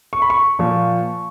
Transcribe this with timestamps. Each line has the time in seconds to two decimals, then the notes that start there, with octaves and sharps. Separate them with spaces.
0.13 C#6
0.22 B5
0.30 C#6
0.59 A#2 F3